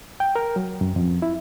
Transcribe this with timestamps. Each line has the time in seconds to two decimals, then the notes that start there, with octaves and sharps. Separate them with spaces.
0.20 G5
0.36 A#4
0.56 F#3
0.81 F#2
0.96 F2
1.22 E4